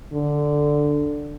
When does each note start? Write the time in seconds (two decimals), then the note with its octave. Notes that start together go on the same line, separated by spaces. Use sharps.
0.13 D3